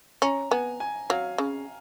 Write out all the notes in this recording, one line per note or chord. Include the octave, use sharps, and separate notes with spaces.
C#4 A#5
B3 G#5
G#5
F#3 F5
C#3